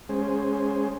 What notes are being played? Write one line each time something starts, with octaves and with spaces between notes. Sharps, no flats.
G#3 C#4 G#4 C5